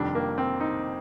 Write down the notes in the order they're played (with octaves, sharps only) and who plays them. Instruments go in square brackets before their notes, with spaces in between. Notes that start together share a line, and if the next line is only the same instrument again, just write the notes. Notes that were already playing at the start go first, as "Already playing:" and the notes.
Already playing: [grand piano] F1 F2 D#3 G3 D4
A#3
C4
D#4